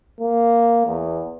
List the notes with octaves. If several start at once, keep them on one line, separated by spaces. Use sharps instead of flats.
A#3
E2